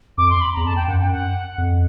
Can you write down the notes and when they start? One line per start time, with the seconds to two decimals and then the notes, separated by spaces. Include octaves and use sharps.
0.18 F2 D6
0.30 C6
0.41 B5
0.54 A#5
0.57 E2
0.64 F2 A5
0.76 G5
0.88 F#2 F#5
1.00 G5
1.12 F#5
1.58 F2